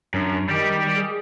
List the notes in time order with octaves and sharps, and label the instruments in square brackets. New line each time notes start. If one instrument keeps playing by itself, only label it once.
[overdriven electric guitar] F#2 [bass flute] D4
[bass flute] D#3 [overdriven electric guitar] G3 G4
[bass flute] G#4